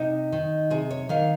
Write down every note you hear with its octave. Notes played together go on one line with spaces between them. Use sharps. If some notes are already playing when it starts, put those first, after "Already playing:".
Already playing: C3 D#4
D#3
C3 G#4
C#5
D#3 F5